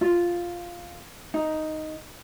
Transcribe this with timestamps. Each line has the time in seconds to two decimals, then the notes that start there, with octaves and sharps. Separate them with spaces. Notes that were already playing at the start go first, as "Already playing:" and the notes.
0.01 F4
1.34 D#4